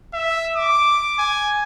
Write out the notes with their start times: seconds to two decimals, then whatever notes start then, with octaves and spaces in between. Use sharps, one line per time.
0.14 E5
0.56 D6
1.19 G#5